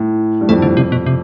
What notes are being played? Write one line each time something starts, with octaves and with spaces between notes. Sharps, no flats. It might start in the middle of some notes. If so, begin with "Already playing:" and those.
Already playing: A2
G2
F2 A3
F2 D3
F2 C3
B2
C3